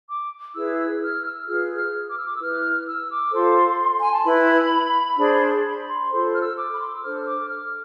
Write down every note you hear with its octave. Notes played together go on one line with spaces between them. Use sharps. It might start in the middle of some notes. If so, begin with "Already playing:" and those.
D6
E4 G#4 B4 E6
E6
F6
E6
F4 G#4 B4 F6
F6
D6
E6
D6
E6
E4 B4 F6
E6
D6
F4 A4 C5 C6
G#5
A5
E4 B4 B5
D4 G#4 C5
B5
C6
F4 A4 C5 C6
F6
E6
D6
B5
C6
D6
E6
D4 A4 C5 F6
E6
D6
F6